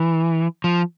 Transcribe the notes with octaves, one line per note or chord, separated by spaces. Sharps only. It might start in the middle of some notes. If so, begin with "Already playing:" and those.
Already playing: E3
F3